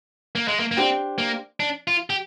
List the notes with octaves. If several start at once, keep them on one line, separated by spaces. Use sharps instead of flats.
A#3
G#3
A#3
A#3
C4 D4 G4 C5
A#3
D4
F4
G4